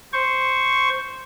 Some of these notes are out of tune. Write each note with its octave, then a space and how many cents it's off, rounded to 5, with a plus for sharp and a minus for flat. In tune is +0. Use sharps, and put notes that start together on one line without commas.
C5 +0 C#6 +0